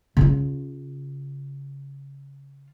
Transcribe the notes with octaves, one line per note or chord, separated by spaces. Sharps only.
C#3 F4